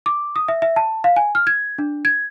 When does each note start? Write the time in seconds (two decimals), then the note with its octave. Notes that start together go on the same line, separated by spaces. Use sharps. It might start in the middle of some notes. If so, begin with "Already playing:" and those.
0.06 D6
0.36 D#6
0.48 E5
0.62 E5
0.76 A5
1.04 F5
1.16 G#5
1.35 F6
1.47 G#6
1.78 D4
2.05 G#6